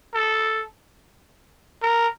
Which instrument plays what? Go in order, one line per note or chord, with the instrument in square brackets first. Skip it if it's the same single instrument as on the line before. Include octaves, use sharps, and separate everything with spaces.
[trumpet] A4
A#4